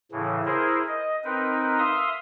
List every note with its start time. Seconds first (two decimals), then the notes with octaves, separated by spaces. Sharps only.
0.12 A2 C#3 E3
0.45 E4 G#4 A#4 C5
0.87 D#5
1.24 C4 D#4 A#4 B4
1.79 E5 F5 C6 D#6